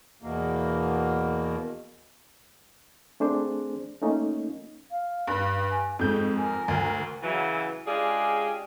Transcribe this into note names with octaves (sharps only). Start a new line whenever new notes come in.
E2 B2 A#3
A3 C4 D4 G#4 C5
A3 A#3 C#4 D#4 F4
F5
G2
G#5
F2 G#2 G#3 A4 G6
A#4 G#5
D2
C#3 E3 F#3
G#3 C#4 D4 F4 G4 G#4